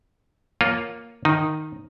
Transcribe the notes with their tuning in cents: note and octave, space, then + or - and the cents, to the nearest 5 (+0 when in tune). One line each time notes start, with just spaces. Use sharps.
A#3 +0 F4 +0 C#5 +0
D#3 -5 D#4 -5